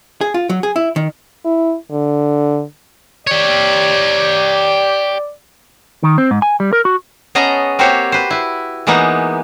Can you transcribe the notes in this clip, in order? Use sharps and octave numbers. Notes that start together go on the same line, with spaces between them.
G#4
F4
F#3
G#4
E4
D#3
E4
D3
G4 C#5 D5
D#3
C4
G#2
G#5
G3
A#4
F#4
B3 C#4 G#4 D#5 A5 A#5
A#3 C4 F#4 G4 C5 C#5
B4 C5
E4 B4
E3 G#3 A#3 B3 D#4